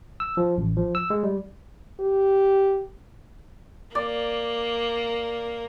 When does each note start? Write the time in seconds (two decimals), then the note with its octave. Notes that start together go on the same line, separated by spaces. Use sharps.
0.20 E6
0.37 F3
0.58 A1
0.77 F3
0.95 E6
1.10 G#3
1.23 G3
2.00 G4
3.95 A#3 D5